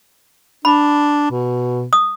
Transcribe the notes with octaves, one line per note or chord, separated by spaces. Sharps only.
D4 B5
B2
D#6